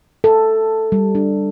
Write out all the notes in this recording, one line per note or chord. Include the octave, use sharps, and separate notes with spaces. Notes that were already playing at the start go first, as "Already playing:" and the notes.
A4
G3
D4